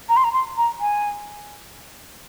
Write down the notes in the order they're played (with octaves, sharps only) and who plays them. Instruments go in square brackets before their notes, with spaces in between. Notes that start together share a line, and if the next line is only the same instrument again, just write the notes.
[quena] A#5
C6
A#5
C6
A#5
G#5